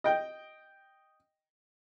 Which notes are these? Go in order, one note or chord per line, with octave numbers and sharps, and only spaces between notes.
D#5 G5